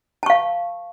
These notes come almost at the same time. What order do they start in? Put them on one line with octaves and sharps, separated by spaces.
A5 C#6 F5